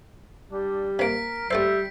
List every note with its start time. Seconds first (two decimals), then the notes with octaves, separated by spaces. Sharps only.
0.52 G3 D4
0.99 C3 A#3 A#4 B6 D7
1.51 G3 A3 A4 C5 E5